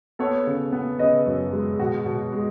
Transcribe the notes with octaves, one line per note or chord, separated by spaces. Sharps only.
B3 A4 C#5
C#3
B3
C#3 B4 D#5
F#2
G#3
B2 F#4
B2
G#3